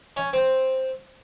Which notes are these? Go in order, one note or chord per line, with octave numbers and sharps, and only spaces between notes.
C#4
C4